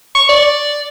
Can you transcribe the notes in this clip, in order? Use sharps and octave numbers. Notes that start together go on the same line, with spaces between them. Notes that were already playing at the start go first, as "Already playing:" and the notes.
C#6
D5